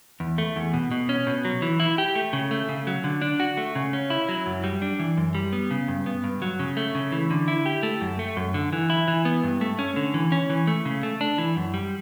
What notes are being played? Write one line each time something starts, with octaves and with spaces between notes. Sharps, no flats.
E2
A3
E2
B2
B2
C#4
B2
F#3
E3
E4
G4
A3
C#3
A3
C#3
F#3
D3
D4
F#4
A3
C#3
C#4
E4
F#3
F#2
G3
D4
E3
F#2
G3
B3
C#3
G2
B3
G2
F#3
C#3
A3
C#3
E3
D3
E4
G4
A3
F#2
A3
F#2
D3
E3
E4
E3
B3
G2
A3
C#4
D3
E3
C#4
E3
A3
C#3
A3
D4
E3
F#2
G3